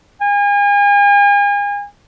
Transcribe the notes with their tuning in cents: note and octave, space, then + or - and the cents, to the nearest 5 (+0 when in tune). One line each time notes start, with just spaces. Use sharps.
G#5 -40